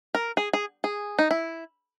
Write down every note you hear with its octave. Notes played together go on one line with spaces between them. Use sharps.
A#4
G#4
G#4
G#4
D#4
E4